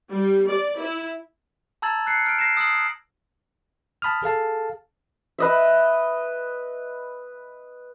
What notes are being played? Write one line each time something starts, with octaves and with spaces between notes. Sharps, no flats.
G3
D5
E4
A5 A#5 E6 G#6 A6 F#7
F#6 C7 C#7
F6 D7
A#6 C7 E7
D#6 E6 C7 F#7
A5 B5 D#6 F6
G#4 A4 F5 A5
B4 D#5 E5